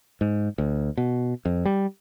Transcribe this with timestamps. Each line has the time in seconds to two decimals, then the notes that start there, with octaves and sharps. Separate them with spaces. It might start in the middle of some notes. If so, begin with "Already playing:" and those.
0.21 G#2
0.58 D2
0.97 B2
1.45 F2
1.65 G3